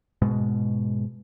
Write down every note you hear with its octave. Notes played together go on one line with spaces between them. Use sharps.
G#2 B2 G#3